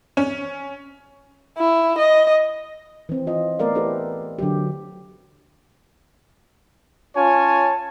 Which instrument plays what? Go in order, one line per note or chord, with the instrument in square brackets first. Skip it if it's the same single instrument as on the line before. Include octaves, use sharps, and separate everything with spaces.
[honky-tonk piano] C#4
[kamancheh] E4
D#5
[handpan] E3 C4
F4 D#5
A3 B3 A#4 D5 F5
E4 G4 A4 B4 C5
D3 F#3 G4
[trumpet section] C#4 F4 C#5 G#5 A5